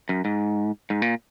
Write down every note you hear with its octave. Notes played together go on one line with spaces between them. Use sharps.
F#2
G#2
G#2
A#2